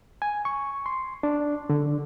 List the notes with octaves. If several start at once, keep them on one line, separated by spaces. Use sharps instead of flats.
G#5
C#6
C6
D4
D3